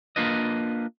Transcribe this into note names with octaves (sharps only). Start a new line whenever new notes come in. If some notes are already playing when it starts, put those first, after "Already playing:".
A#3 D4 F4 B4 D#5